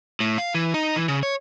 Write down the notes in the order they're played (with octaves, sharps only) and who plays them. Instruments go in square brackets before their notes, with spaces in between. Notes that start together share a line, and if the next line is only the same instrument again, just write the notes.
[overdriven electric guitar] A2
F5
E3
D#4
E3
C#3
C#5